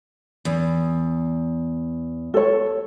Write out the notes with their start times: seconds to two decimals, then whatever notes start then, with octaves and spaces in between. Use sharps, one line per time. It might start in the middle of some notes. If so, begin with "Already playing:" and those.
0.45 E2
2.34 A4 C#5